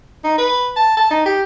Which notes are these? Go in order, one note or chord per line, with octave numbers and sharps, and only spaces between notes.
D#4
B4
A5
A5
D#4
G4